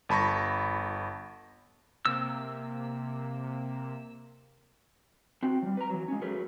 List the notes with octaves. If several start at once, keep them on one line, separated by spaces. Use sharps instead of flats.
G1 A5 B5 C#6 A#6
C3 A#3 E6
C4 F#4 G5
F3 G3
B4 A#5
E3 F#3
G#3 C#4
F#3 A3 F#4 G#4 A#4 B4